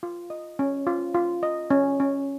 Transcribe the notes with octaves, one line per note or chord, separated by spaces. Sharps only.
F4
D#5
C#4
F4
F4
D#5
C#4
C#4